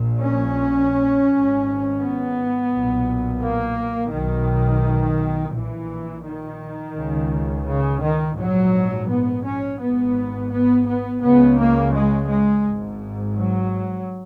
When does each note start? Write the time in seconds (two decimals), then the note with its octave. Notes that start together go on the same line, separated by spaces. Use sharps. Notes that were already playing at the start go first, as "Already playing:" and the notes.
Already playing: A#1 A#2
0.22 C#4
1.28 G#1 G#2
1.99 B3
2.70 B1 A#2
3.41 A#3
4.12 B1 B2 D#3
5.54 A#1 A#2 E3
6.25 D#3
6.96 C#2 C#3
7.67 C#3
8.02 D#3
8.38 A#1 G#2 F#3
9.09 B3
9.44 C#4
9.79 G#1 G#2 B3
10.51 B3
10.86 B3
11.21 C#2 C#3 B3
11.56 A#3
11.93 G#3
12.28 G#3
12.63 G#1 G#2
13.35 F#3